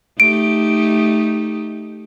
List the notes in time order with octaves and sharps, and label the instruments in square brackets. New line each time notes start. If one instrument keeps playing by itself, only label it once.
[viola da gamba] A3 D#4 G4 [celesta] D7